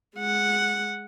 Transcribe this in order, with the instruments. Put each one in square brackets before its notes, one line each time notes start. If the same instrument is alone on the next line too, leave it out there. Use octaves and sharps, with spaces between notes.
[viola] G#3 F#5